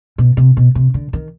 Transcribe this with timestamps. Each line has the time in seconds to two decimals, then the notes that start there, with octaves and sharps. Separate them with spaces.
0.18 B2
0.37 C3
0.57 B2
0.75 C3
0.94 D3
1.13 D#3